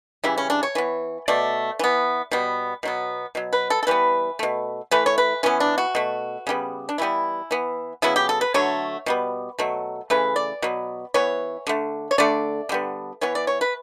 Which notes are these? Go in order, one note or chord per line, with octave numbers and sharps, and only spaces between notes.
C#3 E3 G3 E4
C#4
D4
C#5
E3 B3
B2 A3 D5
E3 B3
B2 G3 B3
B2 F#3 B3
B2 F#3
B4
A4
A4
E3 G3 B3 B4
B2 A3
E3 A3 B4
C#5
B4
E3 B3 C#4
D4
F#4
B2 A3
C#3 G3 B3
D4
E3 G3 B3 E4
E3 B3
C#3 F#3 B3 E4
G4
A4
B4
D3 F#3 A3 C#5
B2 G3 B3
B2 F#3 A3
C#3 E3 A3 B4
D5
B2 F#3 B3
E3 B3 C#5
D3 A3
C#5
D3 A3 D5
D3 G3 B3
E3 B3 C#5
D5
C#5
B4